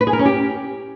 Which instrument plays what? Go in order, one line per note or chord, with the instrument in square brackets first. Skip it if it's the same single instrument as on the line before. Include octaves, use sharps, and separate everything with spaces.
[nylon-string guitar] B4
G#4
A#4
C#4
G4